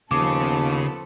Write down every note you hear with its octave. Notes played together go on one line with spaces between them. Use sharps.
D#2 C#3 F3 B3 A4 D6